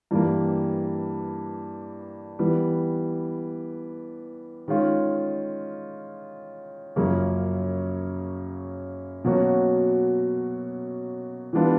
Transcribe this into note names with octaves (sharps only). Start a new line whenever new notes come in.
G2 E3 G3 A#3
E3 G3 B3
D#3 G#3 C#4 F4
F#2 C#3 F3 A#3 C#4
B2 F#3 A#3 C#4 F#4
E3 G3 B3 D4 F4